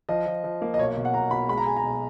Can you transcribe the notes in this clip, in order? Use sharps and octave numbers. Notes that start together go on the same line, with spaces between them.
F3 D#5
F3
F3
A#3
D#5
B1 C#5
B2
F#5
B1 A#5
B2 B5
G#3 B5
A#5
G#3 G#5
A#5
B1